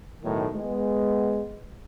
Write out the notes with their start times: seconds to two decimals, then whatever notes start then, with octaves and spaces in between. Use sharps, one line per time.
0.23 B1 A2 D#3
0.56 G#3 B3